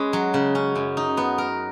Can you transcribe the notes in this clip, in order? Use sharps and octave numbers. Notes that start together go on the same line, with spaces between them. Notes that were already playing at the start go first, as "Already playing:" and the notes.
Already playing: G#3 C#4 G#4 B4
F#3
C#3
C#4
F#2
D#4
B3
A#4